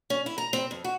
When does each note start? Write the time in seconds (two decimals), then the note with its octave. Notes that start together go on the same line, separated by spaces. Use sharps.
0.10 C#4
0.26 E4
0.38 A#5
0.53 C4
0.71 F2
0.84 F#4